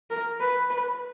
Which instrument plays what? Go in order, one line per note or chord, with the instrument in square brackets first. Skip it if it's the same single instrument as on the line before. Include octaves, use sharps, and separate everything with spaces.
[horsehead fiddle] A#4
B4
B4